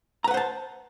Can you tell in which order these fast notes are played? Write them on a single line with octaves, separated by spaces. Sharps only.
A#5 B4 F#5 C5 A5